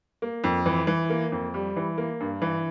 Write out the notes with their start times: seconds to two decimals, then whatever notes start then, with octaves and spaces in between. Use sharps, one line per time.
0.22 A#3
0.44 F2
0.66 E3
0.87 E3
1.10 A#3
1.32 F2
1.54 G3
1.76 E3
1.98 A#3
2.20 G2
2.42 E3